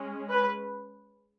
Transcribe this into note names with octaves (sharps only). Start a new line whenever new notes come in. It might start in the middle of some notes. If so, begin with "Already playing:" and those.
Already playing: G#3 C#4
B4